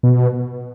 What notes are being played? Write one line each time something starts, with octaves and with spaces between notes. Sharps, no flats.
B2